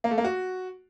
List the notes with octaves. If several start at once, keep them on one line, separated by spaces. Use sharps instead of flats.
A#3
A3
A#3
F#4